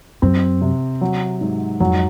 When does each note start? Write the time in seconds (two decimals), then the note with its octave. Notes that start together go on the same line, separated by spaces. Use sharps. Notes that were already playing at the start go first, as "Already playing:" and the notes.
0.22 F#2 C4
0.61 C3
1.01 F#3
1.41 G#2
1.80 F2 F#3